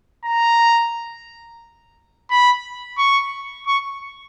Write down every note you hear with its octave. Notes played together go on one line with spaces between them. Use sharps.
A#5
B5
C#6
C#6